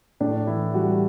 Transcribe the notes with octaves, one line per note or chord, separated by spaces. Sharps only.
A2 D4
E3 E4
G3 F#4